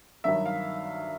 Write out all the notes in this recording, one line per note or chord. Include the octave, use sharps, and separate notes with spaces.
G2 D#3 F#3 E5
F5